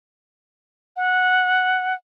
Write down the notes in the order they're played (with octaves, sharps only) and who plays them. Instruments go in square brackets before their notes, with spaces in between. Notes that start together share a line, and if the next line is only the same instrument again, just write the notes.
[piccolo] F#5